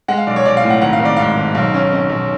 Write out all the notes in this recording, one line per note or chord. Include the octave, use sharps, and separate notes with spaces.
G#3 F#5
F5
B1 D5
C#5
B1 D5
F5
A2
F#5
G#1 F#5
F5
G#1
D5
G#2 F5
G#1
B1 F5
C#4
C#4
B1